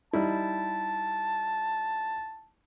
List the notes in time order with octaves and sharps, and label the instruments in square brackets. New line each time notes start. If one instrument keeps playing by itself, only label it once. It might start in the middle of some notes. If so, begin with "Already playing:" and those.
[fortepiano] G3 D#4 E4 [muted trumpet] A5